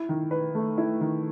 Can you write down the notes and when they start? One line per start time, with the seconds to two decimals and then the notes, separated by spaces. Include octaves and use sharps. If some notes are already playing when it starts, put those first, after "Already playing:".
Already playing: E4
0.09 D#3
0.31 B4
0.55 A3
0.78 E4
1.01 D#3